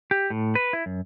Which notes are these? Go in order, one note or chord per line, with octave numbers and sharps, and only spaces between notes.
G4
A2
B4
E4
F#2